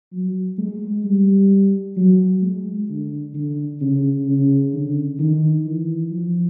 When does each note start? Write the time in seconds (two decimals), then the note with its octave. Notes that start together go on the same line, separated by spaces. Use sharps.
0.13 F#3
0.58 G#3
1.05 G3
1.97 F#3
2.42 G#3
2.89 D3
3.34 D3
3.81 C#3
4.27 C#3
4.74 D3
5.20 D#3
5.65 E3
6.11 F3